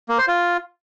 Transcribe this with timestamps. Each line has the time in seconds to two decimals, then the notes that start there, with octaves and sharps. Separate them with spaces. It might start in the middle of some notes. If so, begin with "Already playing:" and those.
0.09 A#3
0.18 C5
0.28 F4